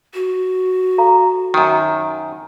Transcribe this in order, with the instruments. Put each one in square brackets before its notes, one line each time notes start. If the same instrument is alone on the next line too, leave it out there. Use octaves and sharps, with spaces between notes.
[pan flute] F#4
[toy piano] A4 F5 A#5
[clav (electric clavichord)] F#2 D#3